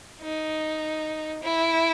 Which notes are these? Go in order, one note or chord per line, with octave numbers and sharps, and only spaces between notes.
D#4
E4